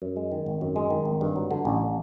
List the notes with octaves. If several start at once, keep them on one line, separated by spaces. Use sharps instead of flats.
F#2
G#3
D#3
G#1
F#2
G#3
D#3
G#1
G2
F#3
D3
A1